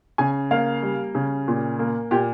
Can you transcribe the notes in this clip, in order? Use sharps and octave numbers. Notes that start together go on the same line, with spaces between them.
C#3 G#5
A#3 F5
G3
C#3
A#2
A#3
A#2 G4